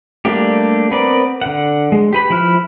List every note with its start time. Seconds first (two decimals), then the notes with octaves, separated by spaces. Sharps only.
0.25 G3 A3 A#3 D4 G4
0.91 B3 C4 A#4 B4 D5
1.41 D3 F#5
1.92 G#3
2.13 G4 B4 B5
2.30 F3 E4 B5 F6 F#6